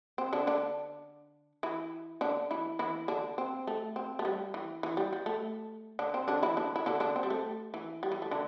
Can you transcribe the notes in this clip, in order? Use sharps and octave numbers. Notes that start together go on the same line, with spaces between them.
C4
D3 D4
D3 D4
E3 E4
D3 D4
E3 E4
E3 E4
D3 D4
C4
A3
C4
A3
G3
E3
E3
G3
G3
A3
D3 D4
C4
D3 D4
E3 E4
D3 D4
E4
D3 D4
D3 D4
C4
G3
A3
E3
G3
E3
A3
D3 D4